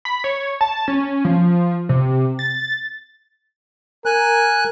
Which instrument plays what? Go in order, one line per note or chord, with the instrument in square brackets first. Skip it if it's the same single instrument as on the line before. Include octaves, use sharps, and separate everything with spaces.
[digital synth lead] B5
C#5
A5
C#4
F3
C3
A6
[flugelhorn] A#4 [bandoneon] G#5 F#6